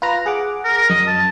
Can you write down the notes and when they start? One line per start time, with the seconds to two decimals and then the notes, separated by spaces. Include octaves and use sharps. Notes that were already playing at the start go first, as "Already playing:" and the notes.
0.02 F4 B4 A#5
0.26 G#4 F#5 D6
0.65 A#4
0.90 F#2 D#5
1.07 A5